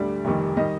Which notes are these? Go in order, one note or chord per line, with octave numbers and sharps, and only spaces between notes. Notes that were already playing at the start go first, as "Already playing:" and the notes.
Already playing: D2 D3 G3 D5
F1 F2 D#3 G3
D#3 G3 D#5